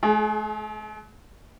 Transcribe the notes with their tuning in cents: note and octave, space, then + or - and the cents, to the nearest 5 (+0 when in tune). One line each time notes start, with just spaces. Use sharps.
A3 -45 G#4 +25